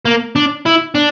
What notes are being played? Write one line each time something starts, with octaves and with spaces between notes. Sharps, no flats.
A#3
D4
E4
D4